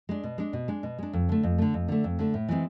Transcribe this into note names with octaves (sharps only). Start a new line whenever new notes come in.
G#3 D4
B2
G#3 D4
B2
G#3 D4
B2
G#3 D4
F2
D3 A3
F2
D3 A3
F2
D3 A3
F2
D3 A3
A2
E3 G#3 C4